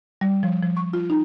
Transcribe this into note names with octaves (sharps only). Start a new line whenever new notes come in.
G3
F3
F3
C#6
F4
D#4